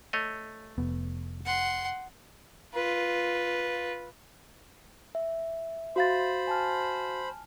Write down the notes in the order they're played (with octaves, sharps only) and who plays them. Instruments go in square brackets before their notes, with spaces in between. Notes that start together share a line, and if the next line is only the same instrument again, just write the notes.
[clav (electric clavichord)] A3 C#5 D#5
[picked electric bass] F1 B3
[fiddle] F#5 C6
[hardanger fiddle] F4 B4
[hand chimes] E5
[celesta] F#4 F5 A6 [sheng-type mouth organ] C5 B5
[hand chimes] G#5 A5 F6